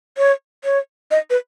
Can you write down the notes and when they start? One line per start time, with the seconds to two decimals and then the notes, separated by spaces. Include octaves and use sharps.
0.18 C#5
0.64 C#5
1.11 D#5
1.30 B4